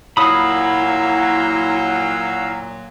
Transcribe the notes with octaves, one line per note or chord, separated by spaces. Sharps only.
A#2 F#3 E4 F5 A#5 B5 D#6 E6